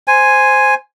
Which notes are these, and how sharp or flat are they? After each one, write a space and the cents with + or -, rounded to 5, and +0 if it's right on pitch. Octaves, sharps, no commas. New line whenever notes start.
C5 +0 G#5 +0